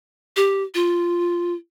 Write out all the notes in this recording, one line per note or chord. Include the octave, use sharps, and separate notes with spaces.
G4
F4